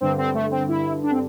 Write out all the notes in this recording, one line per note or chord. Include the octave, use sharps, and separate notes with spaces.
G2 D3 C4
C4
A3
C4
E4
D4
C4